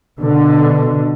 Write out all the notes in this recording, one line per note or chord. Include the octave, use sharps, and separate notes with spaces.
B2 D3